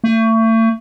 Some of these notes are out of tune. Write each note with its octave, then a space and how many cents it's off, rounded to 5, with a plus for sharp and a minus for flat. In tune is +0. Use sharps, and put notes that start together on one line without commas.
A3 +35